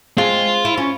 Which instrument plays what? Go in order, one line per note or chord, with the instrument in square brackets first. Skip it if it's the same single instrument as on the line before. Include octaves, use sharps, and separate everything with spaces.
[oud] G#3 C4 [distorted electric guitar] F4
[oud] E4
C#4